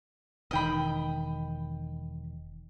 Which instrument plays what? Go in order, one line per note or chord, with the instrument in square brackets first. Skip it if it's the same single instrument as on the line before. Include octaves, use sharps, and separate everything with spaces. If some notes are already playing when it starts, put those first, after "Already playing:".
[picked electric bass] E1 D#3 [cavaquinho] D#5 G5 B5